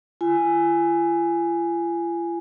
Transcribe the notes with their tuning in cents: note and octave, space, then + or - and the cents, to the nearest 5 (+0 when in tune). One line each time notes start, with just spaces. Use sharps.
F4 -45 G#5 +0